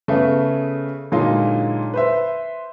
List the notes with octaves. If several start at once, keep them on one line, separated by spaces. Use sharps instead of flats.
C#3 A3 B3 G#4
A#2 D3 F#3 G#3 D#4 F4
B4 C5 E5